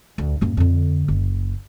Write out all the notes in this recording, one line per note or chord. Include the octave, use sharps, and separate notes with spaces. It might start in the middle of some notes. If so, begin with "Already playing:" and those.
D2
F#2 A#3
F2 D3
F#1